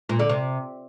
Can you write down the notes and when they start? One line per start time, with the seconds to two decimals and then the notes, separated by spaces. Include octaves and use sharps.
0.09 A#2
0.19 D3
0.29 C3